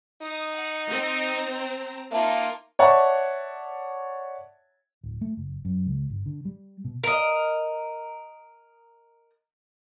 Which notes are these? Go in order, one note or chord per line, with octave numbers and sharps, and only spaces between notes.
D#4 D#6
F#5
C4 A#5
A#3 D#4 F4 E5 A5
C#5 D5 E5 F#5 A5 C#6
D1
A3
F#1
F#2
C#2
G1
D3
G3
B2
A#4 D#5